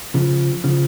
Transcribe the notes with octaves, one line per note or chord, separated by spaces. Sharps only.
C#3 F3
C#3 F3